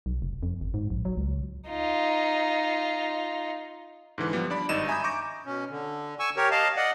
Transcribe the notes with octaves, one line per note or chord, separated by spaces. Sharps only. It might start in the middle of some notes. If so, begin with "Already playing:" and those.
B1
F1
F2
G1
G#2
A#1
F#3
C#2
D#4 F4
G#2 D3 E3
F3 G3 B3
D4 D5 B5
G#1 G2 D#4 D#5 D#7 E7
E5 G#5 A#5 B5 D#6 G6
A#5 C#6 D6 G6 A#6
B2 C#4
D3
G#5 C#6 E6
G4 A#4 C#5
D#5 F5 A5
D5 D#5 F#5